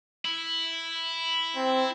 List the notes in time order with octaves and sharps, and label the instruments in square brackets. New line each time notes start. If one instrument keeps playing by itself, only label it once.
[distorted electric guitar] E4
[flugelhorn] C4